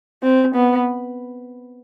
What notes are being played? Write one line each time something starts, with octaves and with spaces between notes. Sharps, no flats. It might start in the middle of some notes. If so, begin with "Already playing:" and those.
C4
B3